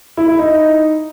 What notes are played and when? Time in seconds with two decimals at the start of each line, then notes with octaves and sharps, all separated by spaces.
0.17 E4
0.28 E4
0.39 D#4